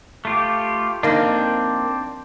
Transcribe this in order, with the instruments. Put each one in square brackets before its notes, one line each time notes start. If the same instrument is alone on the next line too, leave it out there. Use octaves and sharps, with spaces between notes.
[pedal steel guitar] A3 F4 G4
[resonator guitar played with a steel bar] F2 A#3 D#4 [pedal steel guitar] C4 D4